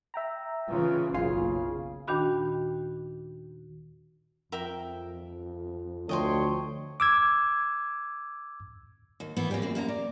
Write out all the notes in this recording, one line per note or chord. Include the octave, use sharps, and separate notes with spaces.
E5 G5 A#5
C#3 E3 F4
F#1 B1 C#3 F4 G#5
D#2 A#2 D#3 D4 F#4 B5
F2 A#4 E5 G5
D2 F3 A4 C#5 D#5 G5 C6
D6 E6 G#6
D#2
E3 B3
A#3 C#4 D4 G4 G#4
F#2 A#2 C4
F#2 A#3 A4 A#5
D5